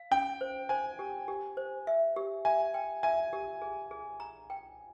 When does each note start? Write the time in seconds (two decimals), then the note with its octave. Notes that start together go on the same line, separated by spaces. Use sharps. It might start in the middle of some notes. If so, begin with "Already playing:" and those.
Already playing: F5
0.11 C#4 G5
0.41 C5
0.69 C5 G#5
0.99 G4
1.28 G4
1.57 C5
1.87 E5
2.16 G4
2.45 E5 G#5
2.74 G5
3.03 E5 G#5
3.33 G4
3.62 G#4
3.91 G#4
4.20 A#5
4.50 G5